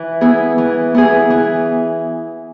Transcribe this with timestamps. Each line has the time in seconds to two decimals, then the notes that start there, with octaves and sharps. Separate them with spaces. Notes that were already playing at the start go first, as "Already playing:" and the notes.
Already playing: E3
0.21 B3 E4 G#4
0.58 E3
0.95 B3 E4 G#4
1.30 E3